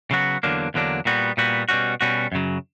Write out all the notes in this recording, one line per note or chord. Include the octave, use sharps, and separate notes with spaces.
C#3 F#3 B3 F#4
E2 D3 F#3 A#3 D4
E2 D3 F#3 A#3 D4
A#2 G3 B3 F#4
A#2 G3 B3 F#4
B2 G3 C#4 F#4
B2 G3 C#4 F#4
F#2 C#3 F#3